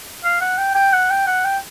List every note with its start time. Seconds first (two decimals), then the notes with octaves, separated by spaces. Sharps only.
0.24 F5
0.41 F#5
0.58 G5
0.75 G5
0.93 F#5
1.10 G5
1.27 F#5
1.45 G5